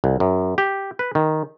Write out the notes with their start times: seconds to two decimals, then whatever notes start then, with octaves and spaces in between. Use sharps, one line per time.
0.04 C2
0.20 F#2
0.58 G4
0.99 B4
1.15 D#3